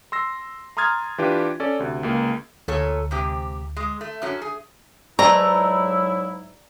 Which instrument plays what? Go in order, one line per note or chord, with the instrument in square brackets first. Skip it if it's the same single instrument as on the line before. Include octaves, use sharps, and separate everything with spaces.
[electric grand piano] C6 E6 A#6 C7
A#5 C6 D#6 F6 G#6 A6
E3 D4 F4 G4 B4
C#4 A4 D5
D2 C3
C#2 G#3 A#3
[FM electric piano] D2 [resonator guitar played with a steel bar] A#2 A4 C#5
[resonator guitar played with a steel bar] G#2 C3 G4
G#3
A3
F#2 F#3 C#4
G#4
[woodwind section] G#2 F#3 E4 [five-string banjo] G#3 A3 B4 [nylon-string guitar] D5 [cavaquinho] A#5